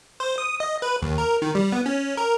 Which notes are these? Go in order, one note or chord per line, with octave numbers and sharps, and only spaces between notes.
C5
D#6
D#5
B4
D#2
A#4
D#3
G3
B3
C#4
A#4